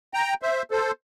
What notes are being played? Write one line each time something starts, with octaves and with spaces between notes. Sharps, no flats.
G5 A#5
C5 E5
A4 C5